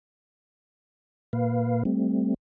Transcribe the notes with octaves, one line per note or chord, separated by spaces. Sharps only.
A#2 A#3 B4 F5
G3 A3 C4